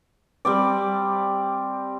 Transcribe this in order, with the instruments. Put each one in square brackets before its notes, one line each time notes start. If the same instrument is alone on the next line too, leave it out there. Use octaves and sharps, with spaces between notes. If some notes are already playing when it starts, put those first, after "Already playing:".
[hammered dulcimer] G3 C4 D5